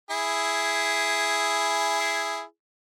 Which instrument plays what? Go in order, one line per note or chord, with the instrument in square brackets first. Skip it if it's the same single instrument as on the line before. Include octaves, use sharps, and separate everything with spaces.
[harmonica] E4 G#4